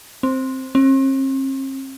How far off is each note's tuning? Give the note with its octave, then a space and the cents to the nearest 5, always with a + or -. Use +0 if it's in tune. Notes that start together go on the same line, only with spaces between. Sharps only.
C4 +5
C4 +45